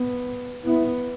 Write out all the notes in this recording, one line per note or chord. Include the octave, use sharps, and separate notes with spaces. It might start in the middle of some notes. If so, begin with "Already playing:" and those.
Already playing: B3
B3 E4